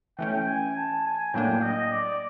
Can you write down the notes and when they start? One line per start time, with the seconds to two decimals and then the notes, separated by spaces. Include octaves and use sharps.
0.18 E3 A3 C#4 G5
0.47 G#5
0.77 A5
1.05 G#5
1.34 A2 F#3 A#3 D4 G5
1.62 D#5
1.92 D5